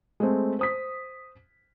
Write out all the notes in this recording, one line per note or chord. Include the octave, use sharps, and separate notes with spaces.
G#3 A3 C4
C5 D#6 B6